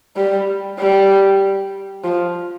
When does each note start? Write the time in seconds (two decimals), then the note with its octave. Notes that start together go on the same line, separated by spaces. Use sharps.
0.17 G3
0.79 G3
2.04 F3